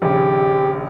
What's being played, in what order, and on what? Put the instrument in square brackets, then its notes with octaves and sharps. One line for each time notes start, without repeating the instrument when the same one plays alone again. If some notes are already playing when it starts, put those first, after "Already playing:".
[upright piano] A#1 D#2 C#3 [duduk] G4